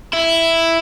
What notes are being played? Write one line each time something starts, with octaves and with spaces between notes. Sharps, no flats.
E4